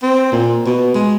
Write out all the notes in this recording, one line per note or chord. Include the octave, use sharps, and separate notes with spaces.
C4
A#2
B2
G#3